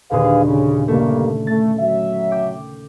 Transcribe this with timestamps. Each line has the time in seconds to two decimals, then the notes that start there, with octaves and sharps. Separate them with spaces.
0.11 D#2 A#2 D3 G#4 B4 F5
0.44 C#3
0.88 G2 C#3 A3 A#3
1.47 A3 A6
1.79 F#3 E5
2.31 G5 D6